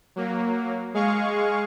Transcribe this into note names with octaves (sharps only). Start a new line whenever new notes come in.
F#3 A#3
G#3 G#4 F5 C#6